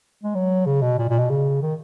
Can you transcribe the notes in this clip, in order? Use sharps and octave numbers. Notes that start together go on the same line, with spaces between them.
G#3
F#3
C#3
B2
A#2
A#2
B2
C#3
D#3